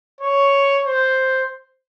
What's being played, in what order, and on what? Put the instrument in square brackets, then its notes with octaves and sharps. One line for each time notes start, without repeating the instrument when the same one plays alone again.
[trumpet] C#5
C5